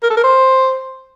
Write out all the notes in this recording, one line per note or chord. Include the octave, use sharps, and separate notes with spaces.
A#4
A4
A#4
C5